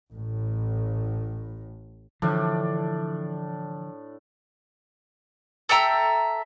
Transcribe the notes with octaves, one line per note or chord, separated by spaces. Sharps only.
A1 A2
A2 D3 E3 F3 D4
A4 E5 G5 A#5